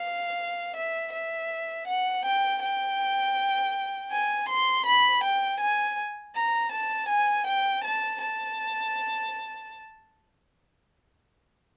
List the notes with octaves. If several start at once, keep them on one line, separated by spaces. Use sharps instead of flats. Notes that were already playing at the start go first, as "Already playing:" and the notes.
Already playing: F5
E5
E5
F#5
G5
G5
G#5
C6
B5
G5
G#5
A#5
A5
G#5
G5
A5
A5